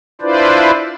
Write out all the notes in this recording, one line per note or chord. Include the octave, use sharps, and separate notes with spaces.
D4 E4 F4 B4 C5 D5